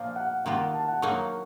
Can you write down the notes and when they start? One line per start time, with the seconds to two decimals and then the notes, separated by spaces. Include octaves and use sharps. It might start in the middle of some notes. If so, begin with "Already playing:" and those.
Already playing: A#2 F3 A#3 F5
0.16 F#5
0.44 D#3 A#3 F4 F#5
0.74 A5
0.88 F#5
1.02 F#3 A#3 D#4 C#6